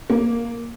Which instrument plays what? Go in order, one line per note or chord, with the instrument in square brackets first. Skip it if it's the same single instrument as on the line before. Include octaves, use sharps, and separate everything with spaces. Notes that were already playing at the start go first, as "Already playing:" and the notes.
[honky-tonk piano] A#3